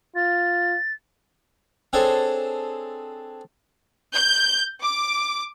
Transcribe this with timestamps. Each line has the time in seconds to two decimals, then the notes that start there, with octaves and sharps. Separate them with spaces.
0.16 F4 A6
1.93 C4 D4 G#4 A4 C5 C#5
4.13 G6
4.81 D6